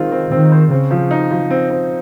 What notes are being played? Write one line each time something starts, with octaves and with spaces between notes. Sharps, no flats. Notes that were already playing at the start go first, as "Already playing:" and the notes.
Already playing: D#3 G#3 C4 F4
C4
D#3 C4
C5
C#3 C4
F3
D#4
F3
C4
C4